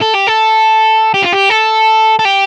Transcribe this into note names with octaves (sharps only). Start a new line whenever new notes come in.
A4
G4
A4
G4
F4
G4
A4
A4
G4